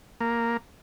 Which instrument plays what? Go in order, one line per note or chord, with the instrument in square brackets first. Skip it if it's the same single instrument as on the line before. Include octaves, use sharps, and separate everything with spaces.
[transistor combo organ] A#3